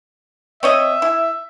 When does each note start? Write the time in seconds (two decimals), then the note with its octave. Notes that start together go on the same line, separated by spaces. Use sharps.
0.63 C4 C#5 D#5 E5
1.02 E4